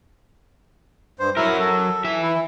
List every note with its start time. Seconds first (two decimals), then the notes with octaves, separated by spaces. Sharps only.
1.19 G2 C5
1.37 F#3 E4 A#4 E5
1.59 A4
2.05 E3 E5
2.23 E4